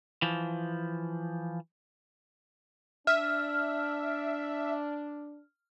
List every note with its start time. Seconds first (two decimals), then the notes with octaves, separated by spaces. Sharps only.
0.22 E3 F3
3.07 D4 E5 F6